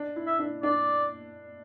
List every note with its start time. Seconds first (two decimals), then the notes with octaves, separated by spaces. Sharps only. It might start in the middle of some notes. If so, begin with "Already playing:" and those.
Already playing: D4
0.16 E4
0.27 E5
0.39 D4
0.63 D4 D5